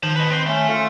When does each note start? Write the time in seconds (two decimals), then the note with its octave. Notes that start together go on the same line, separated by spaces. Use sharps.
0.03 D#3 C5 A5
0.16 B4 D#5
0.30 C4 C5
0.46 A3 C#4
0.68 F4 A4